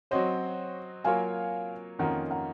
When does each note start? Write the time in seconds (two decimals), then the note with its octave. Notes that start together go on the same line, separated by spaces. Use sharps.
0.11 F#3 C4 F#4 C5 C#5 D#5
1.04 F#3 A#3 F4 A#4 C#5 F5 G#5
1.99 F2 D#3 A#3 C#4 F4 F#5 A#5
2.31 F#5 A#5